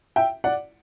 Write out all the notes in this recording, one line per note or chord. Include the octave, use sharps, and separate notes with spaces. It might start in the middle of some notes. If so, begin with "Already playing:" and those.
E5 G5
D5 F#5